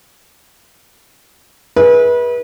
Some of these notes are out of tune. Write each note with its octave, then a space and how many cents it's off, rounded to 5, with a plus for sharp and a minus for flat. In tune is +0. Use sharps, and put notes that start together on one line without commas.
E4 -40 G#4 +0 B4 -30